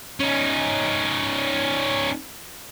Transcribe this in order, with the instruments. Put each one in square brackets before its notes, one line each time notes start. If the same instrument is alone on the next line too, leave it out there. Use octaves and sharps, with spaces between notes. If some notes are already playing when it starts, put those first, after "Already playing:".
[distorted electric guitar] C#4 D#4